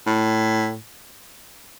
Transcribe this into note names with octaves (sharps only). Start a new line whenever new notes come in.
A2